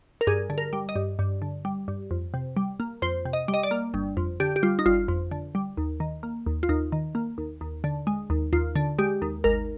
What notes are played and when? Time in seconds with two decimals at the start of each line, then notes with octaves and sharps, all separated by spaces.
0.21 A#4
0.27 G2 G#4
0.50 D3
0.58 A#4
0.73 G3
0.89 D#5
0.96 G2
1.19 G2
1.42 D3
1.65 G3
1.88 G2
2.11 F2
2.34 C3
2.57 G3
2.80 A#3
3.02 F2 C5
3.25 C3
3.33 D#5
3.48 G3
3.54 D#5
3.63 D5
3.71 A#3
3.94 G1
4.17 F2
4.40 D3 G4
4.56 G4
4.63 G3 F4
4.79 D#4
4.86 G1 F4
5.08 F2
5.31 D3
5.55 G3
5.77 D#2
6.00 D#3
6.23 A#3
6.47 D#2
6.63 F4
6.69 D#2 D#4
6.92 D#3
7.15 A#3
7.38 D#2
7.61 D#2
7.84 D3
8.07 G#3
8.30 D#2
8.53 D#2 F4
8.76 D3
8.99 G#3 G4
9.22 D#2
9.44 G#1 A#4